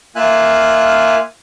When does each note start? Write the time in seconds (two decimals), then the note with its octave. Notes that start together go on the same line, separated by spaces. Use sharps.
0.16 A#3 F4 E5 F5 G#5 F#6